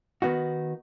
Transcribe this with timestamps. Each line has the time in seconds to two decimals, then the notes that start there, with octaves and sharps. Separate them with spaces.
0.22 D#3 B3 D#4 F#4